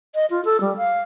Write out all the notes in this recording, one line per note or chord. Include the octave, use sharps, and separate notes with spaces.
D#5
F4
A4
G3
F5